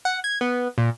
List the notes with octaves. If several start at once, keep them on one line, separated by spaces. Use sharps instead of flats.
F#5
G#6
B3
A#2